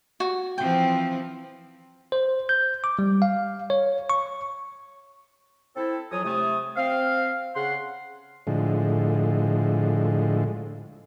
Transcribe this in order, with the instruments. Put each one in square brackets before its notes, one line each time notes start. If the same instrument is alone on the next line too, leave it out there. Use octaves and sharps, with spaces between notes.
[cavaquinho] F#4
[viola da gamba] E3 F3 C4 [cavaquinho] G5
[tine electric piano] C5
G6
D6
G3
F5
C#5
C#6
[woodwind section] C4 E4 A4
F2 F3 F#3 C#5 G#5 D#6
C3 A3 D#6
C4 F5
C#3 F#5 C6
[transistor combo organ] A2 D3 F3 G#3